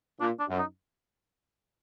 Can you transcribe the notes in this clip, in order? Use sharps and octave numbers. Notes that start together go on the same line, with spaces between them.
A#2 D4
D4
F#2
D#4